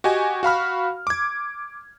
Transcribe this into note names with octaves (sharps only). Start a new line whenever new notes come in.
F#4 G4 D#5 G#5
F#4 F5 B5 F6
D6 G#6